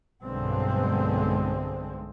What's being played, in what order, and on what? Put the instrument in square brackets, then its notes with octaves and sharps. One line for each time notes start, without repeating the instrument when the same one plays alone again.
[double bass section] B1 G2 D3 G#3 C4